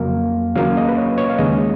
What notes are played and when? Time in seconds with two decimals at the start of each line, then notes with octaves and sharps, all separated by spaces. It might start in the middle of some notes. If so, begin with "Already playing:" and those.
Already playing: F2 C#3 F#3 A#3 F5
0.55 D#2 C#3 F#3 A#3 C#4 F5
0.77 D#5
0.89 B4
0.98 C#5
1.18 C#5
1.30 F5
1.38 D#2 C#3 G#3 C#4 D#5